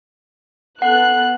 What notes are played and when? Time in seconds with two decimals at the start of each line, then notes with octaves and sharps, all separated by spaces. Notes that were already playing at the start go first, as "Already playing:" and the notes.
0.82 B3 A4 F#5 F#6